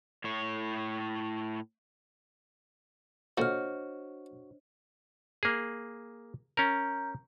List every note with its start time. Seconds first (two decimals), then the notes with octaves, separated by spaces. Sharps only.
0.24 A2 C#5
3.38 A#2 D3 D4 F#4 C5 C#5 D#5 F6
5.43 A#3 G#4
6.57 C#4 A#4 A#5 G6